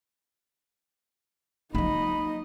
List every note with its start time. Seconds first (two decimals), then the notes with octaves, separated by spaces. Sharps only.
1.75 F#3 A#3 D#4 D#5 B5